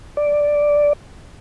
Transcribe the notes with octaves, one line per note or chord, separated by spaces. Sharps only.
D5